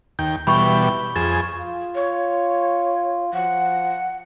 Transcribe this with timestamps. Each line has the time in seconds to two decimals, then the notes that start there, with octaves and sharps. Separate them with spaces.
0.19 D#2 G5 G6
0.47 B2 E3 G3 B5 C#6 G7
1.16 F2 G#4 A6 E7
1.56 F4
1.95 C#5
3.34 F3 F#5